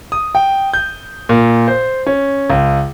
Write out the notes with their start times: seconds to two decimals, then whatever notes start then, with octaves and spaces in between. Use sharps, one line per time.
0.12 D#6
0.35 G5
0.74 G6
1.29 A#2
1.68 C5
2.06 C#4
2.50 C#2